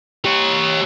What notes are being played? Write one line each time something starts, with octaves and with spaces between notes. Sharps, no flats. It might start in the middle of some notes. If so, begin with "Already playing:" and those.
G4 C#5